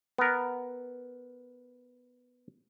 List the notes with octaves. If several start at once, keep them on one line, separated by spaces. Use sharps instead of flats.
B3 A#4